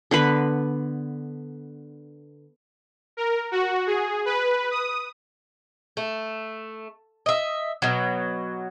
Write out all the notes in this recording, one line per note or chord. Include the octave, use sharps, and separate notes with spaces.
D3 B3 B4
A#4
F#4
G#4
B4
D#6
A3
D#5 E5
B2 F#3